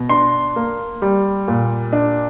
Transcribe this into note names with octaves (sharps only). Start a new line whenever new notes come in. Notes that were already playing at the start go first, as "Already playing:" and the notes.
Already playing: B2
D4 C6
A#3
G3
A#2
D4